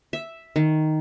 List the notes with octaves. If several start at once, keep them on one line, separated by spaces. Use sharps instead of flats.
E5
D#3